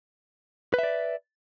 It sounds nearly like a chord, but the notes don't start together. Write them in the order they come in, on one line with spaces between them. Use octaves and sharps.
B4 E5 D5